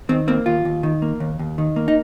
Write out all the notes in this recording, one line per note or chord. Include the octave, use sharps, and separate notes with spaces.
D#3 C4
A#3 C4
D#2 F4
D#2
D#3
A#3
D#2
D#2
D#3
A#3
D#4